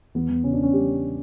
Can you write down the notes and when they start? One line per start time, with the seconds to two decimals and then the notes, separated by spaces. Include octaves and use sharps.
0.15 E2 B3
0.29 E2
0.44 C#3 C#4
0.53 D4
0.59 C#3 C#4
0.73 G3 G4